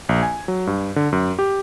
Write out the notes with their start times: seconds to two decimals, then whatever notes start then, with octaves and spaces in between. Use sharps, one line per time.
0.09 A#1
0.23 G#5
0.48 F#3
0.67 G2
0.96 D3
1.12 F#2
1.39 G4